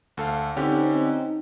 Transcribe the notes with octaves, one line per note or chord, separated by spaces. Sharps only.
D2 A4 F5
D3 C4 C#4 D#4 G4